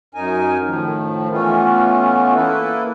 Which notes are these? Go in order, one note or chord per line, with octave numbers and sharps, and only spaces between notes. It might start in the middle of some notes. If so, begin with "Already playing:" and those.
F#2 D#4 A#4 G#5
A2 D#3 F3
E3 A3 B3 C#4 F4
A#3 E4 A4 B4